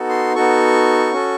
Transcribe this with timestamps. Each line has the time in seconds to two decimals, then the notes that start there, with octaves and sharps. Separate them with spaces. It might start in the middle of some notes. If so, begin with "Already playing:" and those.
Already playing: B3 D#4 F#4 A4
0.09 C6
0.35 B3 D#4 F#4 A4 C#6
1.12 C#4 F#4 A4